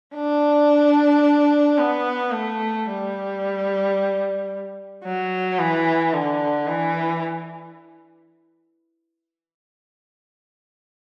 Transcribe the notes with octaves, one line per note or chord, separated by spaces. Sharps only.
D4
B3
A3
G3
F#3
E3
D3
E3